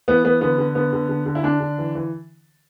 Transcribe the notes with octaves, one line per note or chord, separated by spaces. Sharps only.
E3 B3
E3 B3
D3 B3
D3
D3 B3
D3
D3
D3
E4
D3 D4
D3
E3
E3